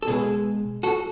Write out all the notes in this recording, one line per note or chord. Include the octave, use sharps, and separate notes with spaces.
A4
B2 G#3 G#4 B4
F#4 A4